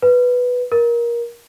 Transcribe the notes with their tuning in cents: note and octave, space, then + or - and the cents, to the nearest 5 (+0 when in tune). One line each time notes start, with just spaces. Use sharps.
B4 +0
A#4 +20